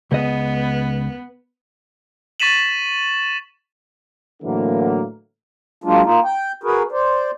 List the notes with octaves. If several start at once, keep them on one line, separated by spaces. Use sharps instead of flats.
C#2 B3 D#5
C#6 A6 B6 D#7 E7 F#7
A2 D3 E3 F#3 A#3
F#3 G#3 A#3 D4 F4
A#3 D#4 F4
G5
F#4 G#4 A#4 B4
C5 D5